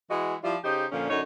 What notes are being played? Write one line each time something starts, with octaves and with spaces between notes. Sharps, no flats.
E3 G#3 E4 F#4
F3 G3 E4 F4
C#3 D#4 G4 C5
A#2 D3 F3 C#4
F#2 D3 D#4 C#5